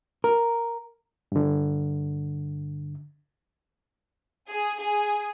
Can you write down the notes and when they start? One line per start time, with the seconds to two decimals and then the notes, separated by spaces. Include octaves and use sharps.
0.24 A#4
1.32 G2 D3
4.50 G#4
4.80 G#4